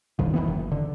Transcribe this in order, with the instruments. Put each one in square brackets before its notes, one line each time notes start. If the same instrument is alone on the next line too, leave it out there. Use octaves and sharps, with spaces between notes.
[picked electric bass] F1 C2 F2 D#3
D#3 E3 B3
F#1
D3